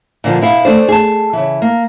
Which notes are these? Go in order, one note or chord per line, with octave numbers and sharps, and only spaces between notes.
A#2 D3 F3
B2 E4 F5 F#5
A3 D4 C5
G#4 A5
C#3 E3
A#3